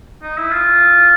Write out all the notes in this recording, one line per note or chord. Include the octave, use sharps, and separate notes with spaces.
D#4
E4
F4